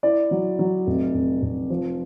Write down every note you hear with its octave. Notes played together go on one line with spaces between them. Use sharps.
E4 D5
F#3
F#3
F1
F1
F1
F3